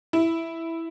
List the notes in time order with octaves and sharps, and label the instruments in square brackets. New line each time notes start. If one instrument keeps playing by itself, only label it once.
[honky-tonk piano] E4